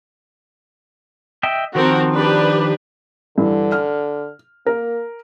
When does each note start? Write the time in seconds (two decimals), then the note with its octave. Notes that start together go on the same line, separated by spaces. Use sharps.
1.43 D#5 E5 G5
1.75 D#3 F3 C4 F#4 A#4
2.13 D4 G4 B4
3.38 G2 D3 E3
3.72 F6
4.66 A#3 A#4